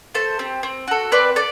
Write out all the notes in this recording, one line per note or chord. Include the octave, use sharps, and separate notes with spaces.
A3 A4 C5
C4 G4
C4
F#4 A4
C4 B4 D5
A4 D5